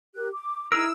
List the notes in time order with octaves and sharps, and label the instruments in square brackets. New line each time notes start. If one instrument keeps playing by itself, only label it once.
[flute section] G4 A#4 F#6
D6
[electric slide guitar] D#4 G#4 A#4 [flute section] E4 [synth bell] E6